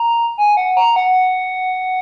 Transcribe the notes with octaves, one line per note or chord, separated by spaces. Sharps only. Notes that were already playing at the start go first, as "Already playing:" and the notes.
Already playing: A#5
G#5
F#5
A#5
F#5